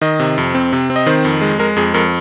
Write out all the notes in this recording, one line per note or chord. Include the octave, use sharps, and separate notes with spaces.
D#3 D#5
C3
F2
C4
C3
C4
D#5
D#3 C5
F2
G#3
G#3 A#4
F2 G#4
F2 A#4